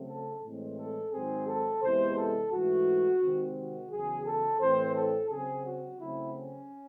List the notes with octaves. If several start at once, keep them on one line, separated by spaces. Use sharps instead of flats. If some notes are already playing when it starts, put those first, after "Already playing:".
Already playing: C#3 F#3 A3 C4
A4
A2 E3 G#3 C4
A4
G#2 D#3 F#3 C4 G#4
A4
E2 C3 E3 G#3 C5
A4
G#2 E3 A3 F#4
C3 D#3 G#3 C4
F#4
E2 C#3 F#3 G#4
A4
A2 E3 C4 C5
A4
C#3 F#3 C4 G#4
F#4
C#3 F#3 A3 C4 E4
C#4